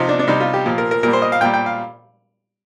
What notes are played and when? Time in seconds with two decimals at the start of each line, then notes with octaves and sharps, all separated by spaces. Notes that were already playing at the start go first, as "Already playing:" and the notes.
Already playing: C3 F3 D#4
0.09 D4
0.19 D4
0.27 C3 G3 D#4
0.40 F4
0.54 G4
0.66 A#2 F3
0.78 A#4
0.91 A#4
1.03 A#2 G3 A#4
1.13 C5
1.22 D#5
1.32 F5
1.41 A#2 G3 G5
1.54 G5
1.66 F5